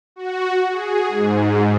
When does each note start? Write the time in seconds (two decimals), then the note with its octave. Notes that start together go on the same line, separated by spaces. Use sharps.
0.16 F#4
0.71 G#4
1.08 G#2